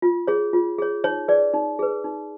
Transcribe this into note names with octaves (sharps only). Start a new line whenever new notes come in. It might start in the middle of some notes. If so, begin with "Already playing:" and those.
F4
G#4 C#5
F4
G#4 C#5
D#4 C#5
G#4 B4 D5
D#4
G#4 B4
D#4